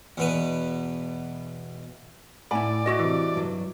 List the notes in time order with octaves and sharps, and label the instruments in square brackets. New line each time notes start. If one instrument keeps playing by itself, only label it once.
[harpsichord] E2 B2 B4
[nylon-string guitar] A2 F#5 G#5 [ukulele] E4 B5 [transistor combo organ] D5
[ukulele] E4 F#4 D#5
[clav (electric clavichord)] C3 E3
[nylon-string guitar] G2 F#3